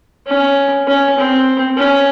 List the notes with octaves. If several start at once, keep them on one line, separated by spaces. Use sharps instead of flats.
C#4
C#4
C4
C#4